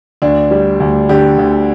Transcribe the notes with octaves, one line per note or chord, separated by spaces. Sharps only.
D2 D4
G3
D2
D3 G4
D2